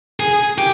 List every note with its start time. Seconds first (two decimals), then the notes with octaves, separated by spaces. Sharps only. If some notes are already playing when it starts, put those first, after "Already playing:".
0.20 G#4
0.58 G4